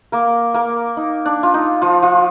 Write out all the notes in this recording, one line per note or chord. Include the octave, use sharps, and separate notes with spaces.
A#3 A#4
A#3 A#4
D#4
D4
F4
D#4
F3 F4
F3 F4